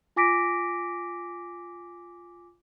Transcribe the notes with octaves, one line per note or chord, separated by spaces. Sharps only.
F4 G#5 D6 A#6 B6 D7